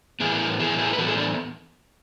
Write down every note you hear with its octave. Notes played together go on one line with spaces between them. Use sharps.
A2 E3 B3 E4 G#4
A2 E3 B3 E4 G#4
E4 G#4
B4
A2 E3 B3 F#4 A4
E4 G#4
D4